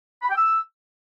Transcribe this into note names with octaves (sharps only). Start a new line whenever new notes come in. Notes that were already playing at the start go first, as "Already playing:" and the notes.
B5
G5
E6